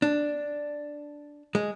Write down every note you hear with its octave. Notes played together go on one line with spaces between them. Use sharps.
D4
G#3